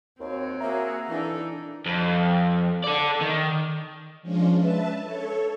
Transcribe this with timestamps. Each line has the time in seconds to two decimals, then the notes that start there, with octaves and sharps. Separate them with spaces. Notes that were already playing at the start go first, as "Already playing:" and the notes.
0.20 D#2 C4 F#4 C#5
0.61 A#3 F#4 G#4 E5 A#5
1.08 E3 D4 D#4 A4 E6
1.86 F2
2.84 A4 D5
3.21 D#3
4.22 F3 G#3 C#4 D4 F4
4.56 B4 E5 A5
5.01 A4 C#5